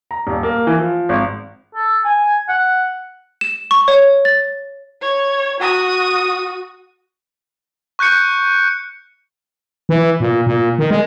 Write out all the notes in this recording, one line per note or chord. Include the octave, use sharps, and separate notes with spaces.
A#5
D#1
A#3
E3
F3
G#1
A4
G#5
F#5
E7
C#6
C#5
A6
C#5
F#4 D#6
C#6 F#6 G6 C#7
E3
A#2
A#2
D#3
G#3